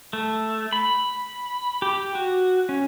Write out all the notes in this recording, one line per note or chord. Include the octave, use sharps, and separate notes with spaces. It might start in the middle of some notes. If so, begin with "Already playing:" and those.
A3
B5
G4
F#4
C#4